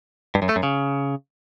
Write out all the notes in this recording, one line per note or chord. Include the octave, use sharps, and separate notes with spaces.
G2
F#2
A3
F#2
C#3